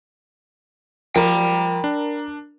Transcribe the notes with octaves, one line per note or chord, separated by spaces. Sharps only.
F3 A#4 G5 B5
D4